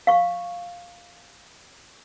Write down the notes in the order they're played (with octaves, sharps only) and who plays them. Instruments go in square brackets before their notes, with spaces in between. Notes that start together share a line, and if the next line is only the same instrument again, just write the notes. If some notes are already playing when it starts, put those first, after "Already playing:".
[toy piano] F5 C#6